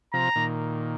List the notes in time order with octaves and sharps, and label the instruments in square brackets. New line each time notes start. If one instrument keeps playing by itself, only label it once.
[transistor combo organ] C3 F3 [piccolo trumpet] A#5
[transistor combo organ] A#2 D#3